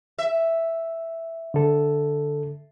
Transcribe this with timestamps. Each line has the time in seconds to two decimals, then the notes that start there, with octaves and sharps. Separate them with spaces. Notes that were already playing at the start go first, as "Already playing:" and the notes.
0.19 E5
1.54 D3 A4